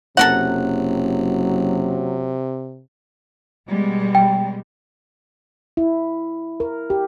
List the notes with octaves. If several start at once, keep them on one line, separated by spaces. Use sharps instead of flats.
F#1 C3 F#3 A4 A#4 F#5
B2 G3 G#3
G5
E4
A#4
G4